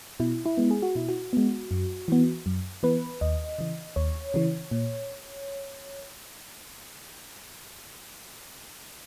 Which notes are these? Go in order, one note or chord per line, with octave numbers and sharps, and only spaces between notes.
B2 E4
E4
G#3 B3
G#4
F#4
B2 E4
F#4
G#3 B3
F#2
E3 B3
F#2
E3 B3 B4
D#2 D#5
C#3 E3
D#2 C#5
C#3 E3
A#2